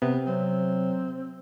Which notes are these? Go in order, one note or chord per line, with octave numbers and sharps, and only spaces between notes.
C3 B3
F#3 C4